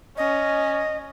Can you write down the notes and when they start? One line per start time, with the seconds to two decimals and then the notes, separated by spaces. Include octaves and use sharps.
0.17 C#4 D#5